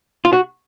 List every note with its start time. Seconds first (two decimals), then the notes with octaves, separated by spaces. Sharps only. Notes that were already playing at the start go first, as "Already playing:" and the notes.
0.25 F4
0.33 F#4